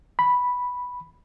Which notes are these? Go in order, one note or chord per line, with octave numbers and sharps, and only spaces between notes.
B5